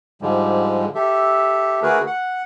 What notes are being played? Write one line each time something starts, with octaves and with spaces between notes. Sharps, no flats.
G#2 D3 F3 G3 G#3
G4 A4 E5
D3 A3 F#4 G#4 A#4 B4
F#5